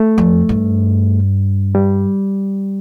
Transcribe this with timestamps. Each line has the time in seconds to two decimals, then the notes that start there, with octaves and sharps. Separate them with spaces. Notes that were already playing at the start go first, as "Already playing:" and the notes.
Already playing: A3
0.18 F2
0.49 G2
1.75 G3